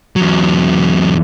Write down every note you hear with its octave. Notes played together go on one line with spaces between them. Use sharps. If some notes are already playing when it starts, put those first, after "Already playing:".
E2 F#3